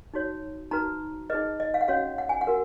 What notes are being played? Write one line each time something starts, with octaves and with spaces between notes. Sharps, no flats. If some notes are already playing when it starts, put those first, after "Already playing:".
D#4 F#4 C#5
D#4 F#4 B4 A#5
D#4 G#4 B4 D#5
D#5
F5
F#5
C#4 F#4 C#5 F5
F#5
G#5
F#5
F#4 A#4